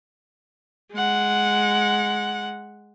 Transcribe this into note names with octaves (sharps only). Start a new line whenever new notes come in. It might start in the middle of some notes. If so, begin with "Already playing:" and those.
G#3 F#5